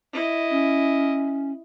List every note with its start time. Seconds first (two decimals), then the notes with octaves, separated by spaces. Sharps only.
0.13 E4 D#5
0.50 C#4